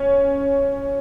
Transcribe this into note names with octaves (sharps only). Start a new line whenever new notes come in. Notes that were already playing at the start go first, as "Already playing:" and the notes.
Already playing: C#4